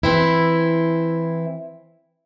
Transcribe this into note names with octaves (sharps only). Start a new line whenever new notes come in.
E3 C4 E4